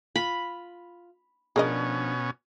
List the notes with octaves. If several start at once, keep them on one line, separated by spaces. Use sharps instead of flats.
F4 B5
B2 F3 C#4 D4 G#4 A#4 D5 D#5